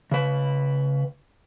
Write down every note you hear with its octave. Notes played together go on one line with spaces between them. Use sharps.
C#3 B4